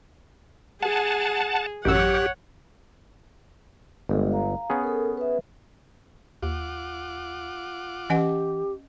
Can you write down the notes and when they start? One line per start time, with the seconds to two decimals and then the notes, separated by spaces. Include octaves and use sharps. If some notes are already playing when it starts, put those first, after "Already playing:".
0.83 G#4 F#5 A5
1.85 A1 F#2 G4 C#5 F#5 E6
4.09 G1 G#3 A4 D#5
4.32 F5 A#5
4.70 B3 C#4 G#4
4.83 A4 A#4
5.17 B4 E5
6.43 D#2 F4 F#5 D6
8.10 E3 C#4 G4 D#5 F#5